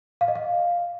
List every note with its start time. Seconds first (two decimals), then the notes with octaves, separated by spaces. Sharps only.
0.21 F5
0.28 D#5
0.35 F5